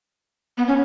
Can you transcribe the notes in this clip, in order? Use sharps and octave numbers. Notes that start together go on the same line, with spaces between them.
B3
C#4